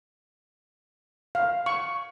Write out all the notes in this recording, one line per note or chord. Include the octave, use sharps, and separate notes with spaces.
F5
C#6